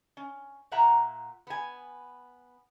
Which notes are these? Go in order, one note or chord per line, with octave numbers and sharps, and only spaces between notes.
C#4
A#2 A#3 E5 F#5 A#5
B3 G#5